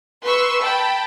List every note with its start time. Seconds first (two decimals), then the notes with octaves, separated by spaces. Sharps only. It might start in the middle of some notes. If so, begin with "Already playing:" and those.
0.23 B4 C6 C#6 E6
0.60 G5 A5 B5